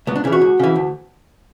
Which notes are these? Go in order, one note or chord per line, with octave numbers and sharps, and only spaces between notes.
C#2 B3
D4
C#3 E3 E4
F#4
C#2
C#3 E3
D2